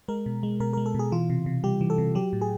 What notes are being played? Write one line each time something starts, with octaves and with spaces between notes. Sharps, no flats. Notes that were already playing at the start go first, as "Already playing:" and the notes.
G#3 A#4
B2
G#3
B2 A#4
G#3 A#4
A4
B2 G#4
E3 F4
C3
C3
G3 G4
E3
A4
C3
F#3 G4
A2
G#4